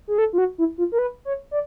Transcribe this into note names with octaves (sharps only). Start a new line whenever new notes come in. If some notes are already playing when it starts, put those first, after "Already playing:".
G#4
A4
F4
F#4
E4
F4
A#4
B4
C#5
D5